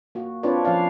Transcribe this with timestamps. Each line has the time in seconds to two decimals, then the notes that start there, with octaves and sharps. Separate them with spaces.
0.15 A#3 F#4
0.43 C4 D4 F4 B4 C#5 D5
0.65 F3 C#4 D5 F5